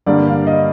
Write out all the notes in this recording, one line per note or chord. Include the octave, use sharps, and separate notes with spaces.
G2 D3 G3 A#3 D5
F5
D#5